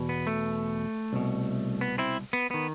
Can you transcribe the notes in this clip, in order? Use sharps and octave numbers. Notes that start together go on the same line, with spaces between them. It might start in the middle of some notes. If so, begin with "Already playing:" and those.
Already playing: E2 B2
B3
A3
C2 B2
B3
C4 E4
B3
D#3 B3